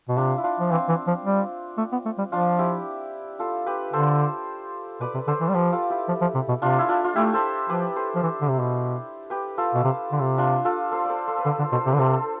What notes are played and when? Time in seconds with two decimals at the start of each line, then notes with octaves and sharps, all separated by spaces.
0.09 B2
0.17 C3 D4 F4
0.38 E4
0.44 D4 F4
0.60 F3
0.71 E3 C4
0.89 E3
1.07 F3
1.25 G3
1.78 A3
1.92 B3
2.06 A3
2.18 G3
2.32 F3 D4 F4
2.59 E4 G4
3.39 F4 A4
3.67 G4 B4
3.93 D3 A4 C5
5.00 B2 B4 D5
5.14 C3
5.28 D3 A4 C5
5.41 E3
5.49 G3
5.54 F3 G4 B4
5.73 F4 A4
5.90 E4 G4
6.08 F3
6.22 F3
6.35 C3
6.49 B2
6.62 C3 D4 F4
6.79 E4
6.89 D4 F4
7.04 F4
7.16 A3 E4 G4
7.33 A4 C5
7.69 F3 G4 B4
7.96 A4 C5
8.16 F3
8.23 E3
8.41 D3
8.50 C3
8.59 B2
9.30 G4 B4
9.58 F4 A4
9.74 B2
9.85 C3
10.12 D3
10.21 C3
10.38 D4 F4
10.65 F4 A4
10.92 A4 C5
11.05 A4 C5 D5
11.28 A4 C5
11.38 B4
11.45 D3 A4 C5
11.59 D3
11.72 B2 A4 C5
11.86 C3
11.89 D3 B4
11.99 C3 A4 C5